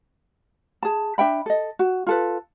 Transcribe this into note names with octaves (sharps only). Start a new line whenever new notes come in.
G#4 A5
D4 E5 G5 B5
A4 D#5
F#4
F4 A4 B4